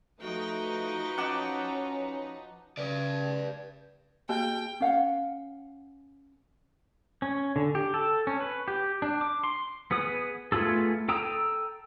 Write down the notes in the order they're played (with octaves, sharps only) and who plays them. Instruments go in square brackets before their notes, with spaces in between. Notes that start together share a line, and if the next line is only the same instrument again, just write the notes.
[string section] F3 D#4 B4 [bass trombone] A3 [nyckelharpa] F#4 G5
[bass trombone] C#4 [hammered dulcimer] F#5 A5 D6
[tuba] C#3 [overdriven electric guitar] B4 D5
[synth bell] A#3 F#4 G#4 [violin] G5
[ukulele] C#4 F5 F#5
[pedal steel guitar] C#4
D3
G4
A4
C#4
B4
G4
D4
D6
C6
B3 G#4 B4 D#6
A3 B3 F4 G#4 A4
A4 G5 A#5 D#6 E6